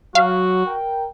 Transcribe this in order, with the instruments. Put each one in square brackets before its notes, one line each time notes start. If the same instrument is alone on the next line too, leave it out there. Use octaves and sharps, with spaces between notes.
[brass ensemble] F#3 [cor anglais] F#4 [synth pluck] F5
[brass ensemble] A#4 G5